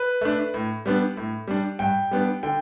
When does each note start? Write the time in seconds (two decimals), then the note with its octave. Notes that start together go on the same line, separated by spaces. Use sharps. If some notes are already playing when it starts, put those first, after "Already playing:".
Already playing: B4
0.21 A3 D4
0.54 A2
0.86 G3 B3 D4
1.17 A2
1.48 G3 D4
1.79 G2 G5
2.11 G3 B3 D4
2.43 D3 G5